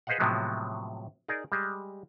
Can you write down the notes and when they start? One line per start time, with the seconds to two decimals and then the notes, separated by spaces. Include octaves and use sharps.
0.07 G#4 B4 C5 D#5 F5 F#5
0.20 A2 C3 F3 F#3 G#3 B3
1.28 D#4 G#4 A#4 D5
1.52 G3 G#3